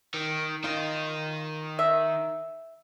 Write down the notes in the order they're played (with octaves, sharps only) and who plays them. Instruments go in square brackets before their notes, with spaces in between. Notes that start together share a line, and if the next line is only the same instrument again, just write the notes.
[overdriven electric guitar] D#3
[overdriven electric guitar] D#3 D#4 [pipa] F4
[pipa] E5